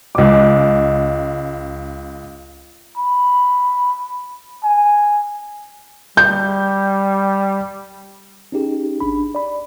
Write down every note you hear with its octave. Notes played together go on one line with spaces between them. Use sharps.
C#2 D6
B5
G#5
G3 G6
C#4 D#4 G4 G#4
G#1 D4 B5
D5 B5